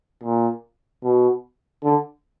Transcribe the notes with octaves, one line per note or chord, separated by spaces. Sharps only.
A#2
B2
D3